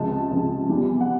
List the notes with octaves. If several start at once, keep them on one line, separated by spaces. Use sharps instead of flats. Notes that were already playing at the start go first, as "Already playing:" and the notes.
Already playing: C#2 C3 F3 G#3 A5
C#2 C3 F3 G#3
E2 C3 E3 G3
F#5